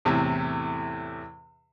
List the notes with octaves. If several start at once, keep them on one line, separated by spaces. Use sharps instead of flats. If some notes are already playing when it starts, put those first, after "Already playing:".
E2 A2 C3